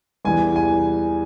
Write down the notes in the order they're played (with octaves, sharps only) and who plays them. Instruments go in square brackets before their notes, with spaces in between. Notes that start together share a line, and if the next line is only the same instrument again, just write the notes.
[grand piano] E2 E3 G3 G#5
G#5